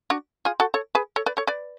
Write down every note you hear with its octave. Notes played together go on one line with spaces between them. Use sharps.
D4 F#4
F4 G#4
F#4 A4
A4 C#5
G#4 B4
A4 C#5
B4 D5
A4 C#5
B4 D5